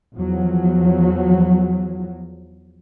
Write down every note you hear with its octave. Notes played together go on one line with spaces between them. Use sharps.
E2 F3 F#3